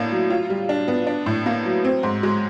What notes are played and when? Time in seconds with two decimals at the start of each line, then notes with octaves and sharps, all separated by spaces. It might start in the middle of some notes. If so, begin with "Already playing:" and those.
Already playing: A2 A#3 D4
0.11 F#3
0.30 F4
0.50 G3
0.69 D4
0.88 B3
1.07 D4
1.26 A2
1.46 A#3
1.65 F#3
1.85 C4
2.03 G#2
2.23 G#3